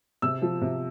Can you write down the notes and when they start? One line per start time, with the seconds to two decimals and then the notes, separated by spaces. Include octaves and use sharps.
0.22 C3 E6
0.42 F3
0.62 C3